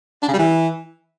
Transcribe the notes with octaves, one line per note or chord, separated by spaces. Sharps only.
D4
C#3
G3
E3